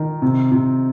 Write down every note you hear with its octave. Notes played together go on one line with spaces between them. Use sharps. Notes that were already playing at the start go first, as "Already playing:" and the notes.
Already playing: D#3
C3
C3